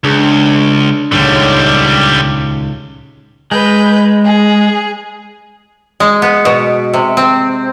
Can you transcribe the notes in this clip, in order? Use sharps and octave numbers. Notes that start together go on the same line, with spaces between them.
C#2 D4 G#4
D#1 C#2 D3 G3
G#3 B4 G6
G#4
G#3
B3
B2
C3
C4